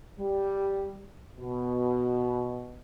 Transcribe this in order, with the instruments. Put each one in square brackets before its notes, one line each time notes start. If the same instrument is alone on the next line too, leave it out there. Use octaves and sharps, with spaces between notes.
[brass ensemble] G3
B2